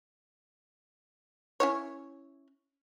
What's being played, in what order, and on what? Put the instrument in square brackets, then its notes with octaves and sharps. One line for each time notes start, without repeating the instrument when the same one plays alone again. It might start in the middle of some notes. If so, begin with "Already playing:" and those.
[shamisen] C#4 E4 C#5